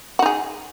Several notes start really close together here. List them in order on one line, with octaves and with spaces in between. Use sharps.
F#4 D#4 G#4